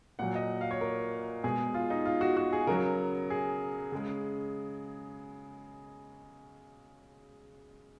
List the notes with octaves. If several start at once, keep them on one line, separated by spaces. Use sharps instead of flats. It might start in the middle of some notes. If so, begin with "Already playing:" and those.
A#2 F#3 F#5
D#5
F5
C#5
A#4
B2 G#3 G#4
F4
D#4
F4
F#4
F#4
G#4
C#3 F#3 A#4
G#4
C#3 G#3